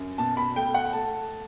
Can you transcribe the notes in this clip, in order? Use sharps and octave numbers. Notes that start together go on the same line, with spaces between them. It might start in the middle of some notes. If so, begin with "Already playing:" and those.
Already playing: F#2
B2 A5
B5
A3 G5
F#5
A3 A5